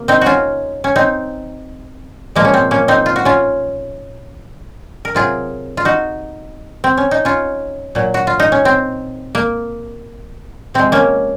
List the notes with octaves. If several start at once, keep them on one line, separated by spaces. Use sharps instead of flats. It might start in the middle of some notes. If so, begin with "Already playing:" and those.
Already playing: C3 A#3
C4 D#4
C#4 F4 F#4
C#4
C4 D#4
A#2 F3 G#3 A#3
C#4
C4
A#3 C#4
C4 D#4
F4
F#4
C#4 F4
A#4
C3 F#3 F4 G#4
F4
D#4 F#4
C4
C#4
D#4
C#4 F4
A#2 F#3
F#4
F4
D#4
C#4
C4
A#3
C3 F3 G#3 C4
A#3 C#4